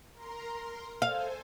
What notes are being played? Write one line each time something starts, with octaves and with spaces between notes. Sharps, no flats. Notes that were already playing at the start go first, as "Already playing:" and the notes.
A#4 A#5 C6
A4 C5 F5 G#5